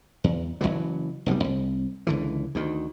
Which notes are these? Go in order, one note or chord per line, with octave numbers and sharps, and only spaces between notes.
E2
F#1 D2 E3 F#3
F1 B1 G#2 G3
C2
C#2 D3 E3
D2 D#3